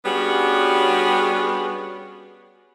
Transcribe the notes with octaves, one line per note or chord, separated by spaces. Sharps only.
G3 B3 C#4 D4 F#4 G#4